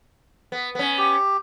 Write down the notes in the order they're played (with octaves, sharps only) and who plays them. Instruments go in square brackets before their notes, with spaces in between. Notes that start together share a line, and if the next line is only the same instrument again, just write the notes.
[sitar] B3
B3 C#4
[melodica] G4